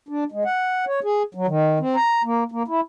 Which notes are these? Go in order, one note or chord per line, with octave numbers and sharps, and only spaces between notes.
D4
G#3
F#5
C#5
G#4
F#3
D#3
C4
A#5
A#3
A#3
E4